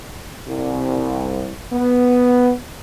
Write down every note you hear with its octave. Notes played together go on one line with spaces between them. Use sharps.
C2
B3